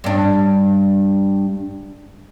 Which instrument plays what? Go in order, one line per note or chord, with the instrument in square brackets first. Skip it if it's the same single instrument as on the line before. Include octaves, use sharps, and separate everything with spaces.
[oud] G2 D4